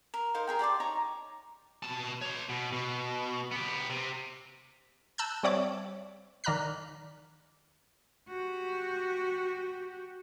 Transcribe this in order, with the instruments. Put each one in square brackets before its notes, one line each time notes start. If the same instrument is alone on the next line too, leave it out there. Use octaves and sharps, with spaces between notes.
[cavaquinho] A#4
D#4 A#4 C5 F5
G#4 A#4 G5
G4 D5 A5 C6
D#4 C#5 A#5
[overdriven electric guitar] B2 A5
C#5 C6
B2
B2
B3 G4
C3
[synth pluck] A5 E6 F#6 G6
G3 C4 C#5 D5 E5 D6
D#3 D5 A#5 F6 F#6 B6
[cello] F#4 G4